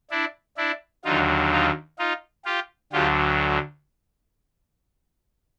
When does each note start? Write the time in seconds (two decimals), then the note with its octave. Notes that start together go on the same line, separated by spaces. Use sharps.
0.11 D4 E4
0.57 D4 E4
1.04 D#2 D3 F#3 D#4 F4
1.52 D#4 F4
1.99 D#4 F4
2.45 F4 G4
2.92 D2 D3 F#3 F4 G4